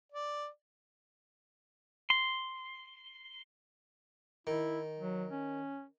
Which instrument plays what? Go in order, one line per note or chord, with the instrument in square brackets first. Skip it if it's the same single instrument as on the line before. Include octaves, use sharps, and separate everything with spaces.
[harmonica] D5
[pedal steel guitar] C6
[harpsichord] D#3 [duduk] E4
[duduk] F#3
C#4